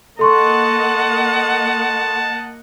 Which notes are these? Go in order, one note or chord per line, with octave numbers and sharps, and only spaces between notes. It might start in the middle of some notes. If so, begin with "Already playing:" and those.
A#3 A4 D#5 F#5 A5 C6 C#6